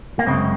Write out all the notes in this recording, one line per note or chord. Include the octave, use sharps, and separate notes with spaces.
A#3
F#2 C#3 G#3 C4